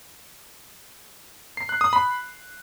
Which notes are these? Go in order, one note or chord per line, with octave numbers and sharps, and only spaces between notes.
C7
F#6
D#6
B5